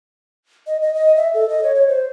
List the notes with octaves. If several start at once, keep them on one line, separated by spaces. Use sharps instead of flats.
D#5
D#5
D#5
E5
A4
D#5
C#5
C#5
C5